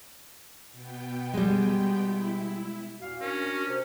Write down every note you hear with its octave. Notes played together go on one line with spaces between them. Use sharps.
B2 B3 G5
G3 G#3
E4
E2 A#2 F#4 F5
C#4 D4 A#4
C3 C5